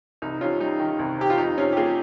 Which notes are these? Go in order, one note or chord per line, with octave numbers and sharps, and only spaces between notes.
C2 D#4
C3 C#4 F4
G3 D#4
D#3
C2
C3 G4
F4
F2 D#4
C3 C#4 F4
G4
A#3 F4 G#4